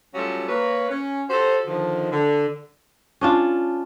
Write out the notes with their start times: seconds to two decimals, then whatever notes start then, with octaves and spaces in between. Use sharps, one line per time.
0.14 F#3 G3 A3 C#4 F4 F#4
0.48 A#3 B4 C#5
0.90 C#4
1.30 F#4 G4 A4 C5
1.67 D3 D#3 F3
2.12 D3
3.21 C#4 D4 F4